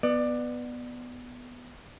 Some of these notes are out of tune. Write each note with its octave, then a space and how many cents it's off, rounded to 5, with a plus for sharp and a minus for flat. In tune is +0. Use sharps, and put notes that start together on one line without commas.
B3 +0 D5 +20